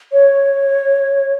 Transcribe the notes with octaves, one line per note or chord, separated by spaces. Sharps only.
C#5